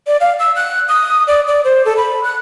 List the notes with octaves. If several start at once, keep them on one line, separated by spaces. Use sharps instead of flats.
D5
F5
E6
F#6
D#6
D5
D5
C5
A4
B5
F#6